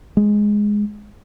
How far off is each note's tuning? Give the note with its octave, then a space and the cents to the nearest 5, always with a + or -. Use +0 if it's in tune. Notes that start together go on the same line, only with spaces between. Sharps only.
G#3 +0